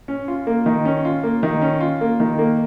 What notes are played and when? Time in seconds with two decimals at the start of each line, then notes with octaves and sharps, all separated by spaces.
0.08 C#4
0.28 F4
0.47 A#3
0.66 D#3
0.85 C#4
1.05 F4
1.23 A#3
1.43 D#3
1.61 C#4
1.81 F4
2.01 A#3
2.20 D#3
2.39 A#3